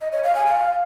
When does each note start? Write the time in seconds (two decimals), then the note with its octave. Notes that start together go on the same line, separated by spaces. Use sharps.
0.01 D#5
0.12 C#5
0.23 F5
0.35 G#5
0.46 F5